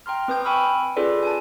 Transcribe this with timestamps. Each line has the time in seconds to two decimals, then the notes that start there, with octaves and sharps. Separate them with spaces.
0.06 G5 A#5 C6 F6
0.28 C4 B4 D#6 G6
0.45 G5 G#5 B5 C#6 E6 F6
0.96 C#4 F4 G#4 A4 B4 D5
1.23 G#5 A5